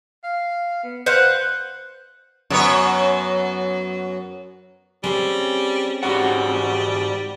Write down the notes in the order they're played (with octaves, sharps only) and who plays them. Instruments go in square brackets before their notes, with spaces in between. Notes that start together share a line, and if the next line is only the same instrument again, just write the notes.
[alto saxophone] F5
B3
[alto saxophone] B4 [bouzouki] C5 F5 F#5 [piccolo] F#6
[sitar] F#2 B3 C#5
[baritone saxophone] G3 [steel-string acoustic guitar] G#3 C4 C#4
[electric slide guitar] G#2 F#4 F#5 [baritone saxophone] G3